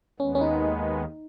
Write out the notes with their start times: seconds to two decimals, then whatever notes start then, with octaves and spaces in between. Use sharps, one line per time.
0.20 D#2 D#3 G#3 B3 C#4
0.35 C#4
0.41 D#4